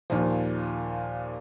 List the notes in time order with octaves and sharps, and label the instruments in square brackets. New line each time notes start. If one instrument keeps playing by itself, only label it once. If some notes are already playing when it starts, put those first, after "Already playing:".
[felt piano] D#2 A#2 F3